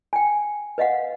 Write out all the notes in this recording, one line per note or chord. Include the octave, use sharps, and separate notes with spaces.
G5 G#5
B4 D#5 F5 F#5